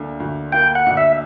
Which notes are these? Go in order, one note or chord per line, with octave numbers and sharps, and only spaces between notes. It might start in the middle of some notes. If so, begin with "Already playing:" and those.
Already playing: D2 D3 A#3
D2
A#3 G5
F#5
D2
E5